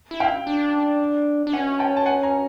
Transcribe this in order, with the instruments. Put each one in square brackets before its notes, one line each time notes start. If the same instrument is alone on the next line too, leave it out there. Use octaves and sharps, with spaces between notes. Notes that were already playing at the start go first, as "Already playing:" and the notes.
[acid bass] E4
[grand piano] F5 G5
[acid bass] D4
D4
[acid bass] C#4 [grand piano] F#5 G#5
[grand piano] G5 A5
A5
F#5 G#5
G#5 A#5